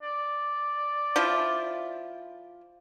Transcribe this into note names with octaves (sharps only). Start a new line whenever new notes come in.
D5
F3 E4 F4